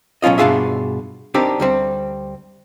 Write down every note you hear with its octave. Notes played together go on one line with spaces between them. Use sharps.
B1 F#3 C#4 F4 D#5
G2 B2 D4 F4 G#4 E5
C4 D4 D#4 G4 A#4
D2 G3 C4